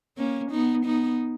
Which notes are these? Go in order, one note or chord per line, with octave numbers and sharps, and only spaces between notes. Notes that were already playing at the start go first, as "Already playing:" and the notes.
A#3 C#4
B3 D#4
B3 D#4